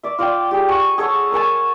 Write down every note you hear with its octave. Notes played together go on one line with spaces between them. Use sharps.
D5 E5
F4 D5 F5 G5
G4 G#4
F#4 G#5 C#6
G#4 A4 C#5 F#5
A#4 C#5 G#5 A5